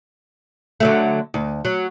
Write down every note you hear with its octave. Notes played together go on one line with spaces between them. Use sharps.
D3 F#3 A3
D2
F#3